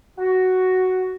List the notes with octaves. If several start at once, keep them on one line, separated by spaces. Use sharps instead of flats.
F#4